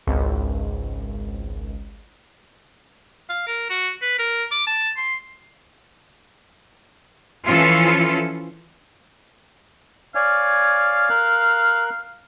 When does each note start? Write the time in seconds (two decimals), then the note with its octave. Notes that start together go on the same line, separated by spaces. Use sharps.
0.07 G#1 C#2
3.29 F5
3.47 A#4
3.70 F#4
4.02 B4
4.19 A#4
4.51 D6
4.67 A5
4.97 C6
7.46 E3 F3 C#4 F4 A4
10.15 C#5 D5 F5 G#5
11.09 A#4 F#6